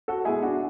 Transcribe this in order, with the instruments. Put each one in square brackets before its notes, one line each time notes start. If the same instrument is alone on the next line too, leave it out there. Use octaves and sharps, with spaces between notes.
[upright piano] F#4 A4
B2 G#3 E4 G#4
D4 F#4